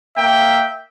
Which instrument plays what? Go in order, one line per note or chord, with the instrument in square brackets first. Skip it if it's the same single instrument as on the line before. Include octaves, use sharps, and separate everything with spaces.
[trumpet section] A#3 E5 G5